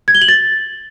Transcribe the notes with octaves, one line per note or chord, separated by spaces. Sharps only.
G#6
G7
F#7
A6